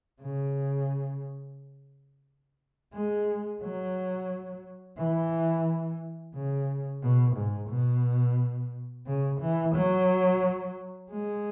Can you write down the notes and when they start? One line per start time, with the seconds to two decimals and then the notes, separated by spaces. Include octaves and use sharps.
0.21 C#3
2.93 G#3
3.62 F#3
4.98 E3
6.34 C#3
7.02 B2
7.36 G#2
7.70 B2
9.06 C#3
9.41 E3
9.75 F#3
11.11 G#3